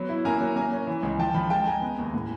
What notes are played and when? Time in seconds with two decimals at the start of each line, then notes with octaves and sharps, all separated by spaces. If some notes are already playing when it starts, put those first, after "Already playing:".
Already playing: F#3 B3
0.09 E4
0.25 A#3 G#5 A#5
0.41 F#3
0.56 A#3 G#5 A#5
0.72 C#4
0.87 E3
1.03 C#2
1.19 F3 G5 A5
1.34 F3 A5 B5
1.50 G#3 G5 A5
1.66 G#3 G#5 A#5
1.82 B3
1.99 D#2
2.14 A2